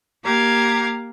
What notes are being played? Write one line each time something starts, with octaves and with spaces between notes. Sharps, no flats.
A#3 G4 F5 A#5 G#6